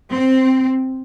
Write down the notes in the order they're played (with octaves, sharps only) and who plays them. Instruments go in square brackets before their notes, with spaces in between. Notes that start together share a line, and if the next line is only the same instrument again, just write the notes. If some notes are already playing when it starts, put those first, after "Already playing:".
[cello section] C4